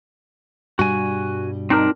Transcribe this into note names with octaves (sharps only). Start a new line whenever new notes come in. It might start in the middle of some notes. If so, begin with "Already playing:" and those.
G2 B2 G3 F#4 G#5
C4 D4 D#4 A#4